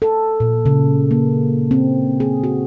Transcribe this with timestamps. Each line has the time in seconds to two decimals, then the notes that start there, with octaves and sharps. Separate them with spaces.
0.02 A4
0.40 A#2
0.66 C#3
1.11 A#3
1.71 C4
2.20 G#4
2.44 F#4